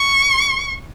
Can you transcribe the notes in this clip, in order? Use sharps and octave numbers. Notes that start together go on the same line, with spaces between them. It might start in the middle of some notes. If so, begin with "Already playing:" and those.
Already playing: C#6